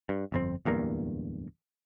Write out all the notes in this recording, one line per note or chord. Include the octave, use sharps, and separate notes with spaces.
G2
G1 F2 C4
D1 E2 G2 A#3